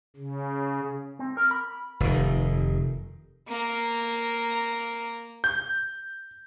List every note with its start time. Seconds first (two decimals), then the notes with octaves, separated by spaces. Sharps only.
0.16 C#3
1.19 C4
1.37 A#4
1.51 B5
2.00 F1 D#3
3.48 A#3 A#5
5.44 G6